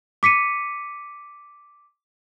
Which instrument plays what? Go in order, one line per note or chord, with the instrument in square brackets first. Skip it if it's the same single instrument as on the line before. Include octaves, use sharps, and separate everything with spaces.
[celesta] D6 B6 C#7 D#7